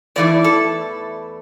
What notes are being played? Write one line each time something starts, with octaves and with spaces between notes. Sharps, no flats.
E2 E3 A3 E4 D5
A4